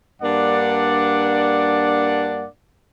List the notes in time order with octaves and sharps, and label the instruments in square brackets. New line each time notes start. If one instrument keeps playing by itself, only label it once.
[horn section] G2 A#3 D4 D5 F#5